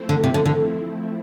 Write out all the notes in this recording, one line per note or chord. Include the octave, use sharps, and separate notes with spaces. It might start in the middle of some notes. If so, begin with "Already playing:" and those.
Already playing: F3 A3 C4 E4
D3
C3
D3
D3